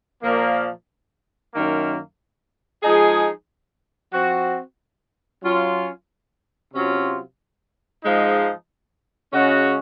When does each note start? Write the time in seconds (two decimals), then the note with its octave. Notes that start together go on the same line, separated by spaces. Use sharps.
0.22 A#2 F3 A#3
1.52 F#2 D#3 A#3
2.82 F3 G#3 D#4 G#4
4.12 F3 C4 F#4
5.43 F#3 C#4 F4
6.73 C3 F#3 C#4 F4
8.04 G#2 F3 G#3 D#4
9.33 C#3 G#3 C#4 F#4